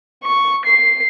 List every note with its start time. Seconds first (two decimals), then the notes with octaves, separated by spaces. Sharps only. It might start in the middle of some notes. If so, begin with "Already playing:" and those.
0.23 C#6
0.65 C7